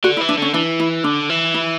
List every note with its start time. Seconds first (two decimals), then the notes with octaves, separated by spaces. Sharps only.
0.04 D3 F#4
0.17 E4
0.21 E3
0.29 D4
0.38 D3 C#4
0.54 E3 D4
0.80 E4
1.04 D3 D4
1.30 E3
1.54 E4